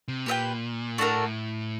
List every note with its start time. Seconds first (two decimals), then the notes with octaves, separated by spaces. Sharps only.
0.08 C3
0.26 A#2 G4 B4 E5 G5
0.98 A2 A3 D4 F#4 A#4